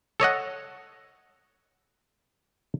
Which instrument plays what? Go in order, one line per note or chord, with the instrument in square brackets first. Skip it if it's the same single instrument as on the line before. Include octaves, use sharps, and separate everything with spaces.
[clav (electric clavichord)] A4 C#5 D#5 F#5